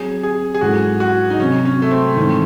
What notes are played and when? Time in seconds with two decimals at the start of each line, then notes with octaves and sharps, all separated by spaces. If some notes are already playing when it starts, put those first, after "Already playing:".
Already playing: F#3 C4 F#4 G#4 C#5
0.23 G#4
0.54 G#4
0.61 G#2 F#3 C#4 E4 F#4 A4
1.00 F#4
1.30 D#4
1.39 C3 F#3 C4 C#4 F#4 C#5
1.65 C#4
1.82 A3
1.91 C4
2.16 G#2 D#3 E3 C4 D#4